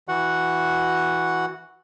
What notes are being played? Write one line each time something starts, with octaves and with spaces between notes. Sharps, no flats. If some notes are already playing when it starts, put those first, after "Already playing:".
E3 F#4 F#5